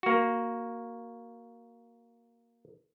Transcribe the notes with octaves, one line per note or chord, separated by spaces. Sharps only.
A#3 F#4